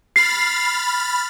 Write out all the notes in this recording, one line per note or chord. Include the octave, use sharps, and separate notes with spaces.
B5 F6 A6 C7